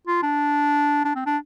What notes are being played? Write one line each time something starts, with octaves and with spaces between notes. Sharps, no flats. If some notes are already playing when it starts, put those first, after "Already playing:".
F4
D4
D4
C4
D4